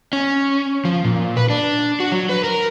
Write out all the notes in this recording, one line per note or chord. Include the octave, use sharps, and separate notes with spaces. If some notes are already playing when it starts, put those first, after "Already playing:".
C#4
F3
A#2
B4
D4
F#4
F#3
B4
A#4